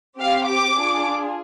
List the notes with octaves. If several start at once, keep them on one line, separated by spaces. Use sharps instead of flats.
C4 G4 F5
D6
D4 F4 G#4